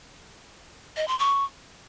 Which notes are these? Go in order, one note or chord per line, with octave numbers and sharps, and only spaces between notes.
D#5
C6
C#6